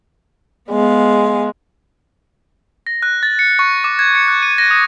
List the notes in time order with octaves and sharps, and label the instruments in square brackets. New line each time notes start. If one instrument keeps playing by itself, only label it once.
[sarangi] G#3 [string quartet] B3 F5
[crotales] A#6
F#6
A6
C#7
C#6
D6
G#6
C#7
F#6
D#7
A#6
D#6